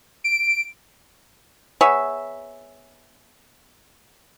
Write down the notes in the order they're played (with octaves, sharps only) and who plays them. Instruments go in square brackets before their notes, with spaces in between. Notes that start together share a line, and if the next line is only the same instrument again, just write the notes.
[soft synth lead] D7
[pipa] B3 G#4 C#5 E5